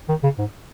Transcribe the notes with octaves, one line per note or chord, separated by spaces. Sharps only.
D#3
C#3
G#2